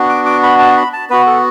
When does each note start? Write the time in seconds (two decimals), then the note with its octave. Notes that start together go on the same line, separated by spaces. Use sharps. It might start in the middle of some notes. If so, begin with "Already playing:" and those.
Already playing: B3 D4 F#4
0.09 D6
0.26 D6
0.43 B5
0.59 A5
0.77 B5
0.93 A5
1.10 B3 F#4 B4
1.27 A4